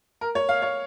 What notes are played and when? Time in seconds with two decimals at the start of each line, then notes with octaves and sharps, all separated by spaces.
0.21 A#4
0.35 C#5
0.49 F5
0.62 C#5